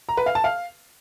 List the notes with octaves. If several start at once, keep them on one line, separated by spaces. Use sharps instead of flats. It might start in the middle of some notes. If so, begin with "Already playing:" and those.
A#5
B4
F5
A5
F5